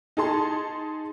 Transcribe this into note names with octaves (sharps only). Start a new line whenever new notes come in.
D#4 G#4 A5 C6